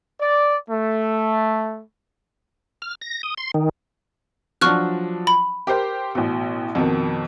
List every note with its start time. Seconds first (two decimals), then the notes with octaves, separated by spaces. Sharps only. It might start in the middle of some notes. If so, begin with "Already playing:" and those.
0.21 D5
0.70 A3
2.82 F6
3.01 A#6
3.23 D#6
3.38 C6
3.54 D#3
4.61 F3 F#3 D4 C#6 F6 F#6
5.27 B5
5.67 G4 A#4 C5
6.15 A1 B2
6.75 F2 B2 D#3